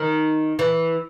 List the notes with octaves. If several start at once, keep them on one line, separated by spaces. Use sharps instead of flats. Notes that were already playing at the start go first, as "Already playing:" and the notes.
Already playing: D#3
E3